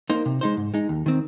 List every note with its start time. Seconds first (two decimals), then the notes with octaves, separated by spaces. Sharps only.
0.10 A#3 D#4 C5
0.26 C3
0.41 G#3 D#4 C5
0.57 G#2
0.74 G#3 D#4
0.89 D#2
1.06 D#3 C4